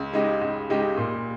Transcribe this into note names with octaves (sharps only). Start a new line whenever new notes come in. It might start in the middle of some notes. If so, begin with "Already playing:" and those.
Already playing: C#2
C#3 G#3 D#4 G4
C#2
C#3 G#3 D#4 G4
A#2